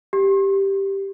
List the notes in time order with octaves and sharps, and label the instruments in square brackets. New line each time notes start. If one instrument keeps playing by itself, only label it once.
[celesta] G4